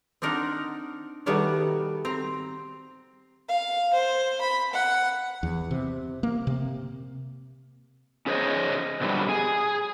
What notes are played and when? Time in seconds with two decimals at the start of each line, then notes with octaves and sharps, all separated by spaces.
0.22 C4 D4 D#4 A#4 F#5
1.26 B2 D#3 G3 A3 B3 F#4
2.05 C4 A#5
3.48 F5
3.93 C5
4.41 B5
4.73 F#5
5.43 E2
5.71 C3
6.23 A#3
6.47 C3
8.26 C#4 G#4 C5 C#5 D#5
9.01 B2 D3 F#3 G3
9.29 G#4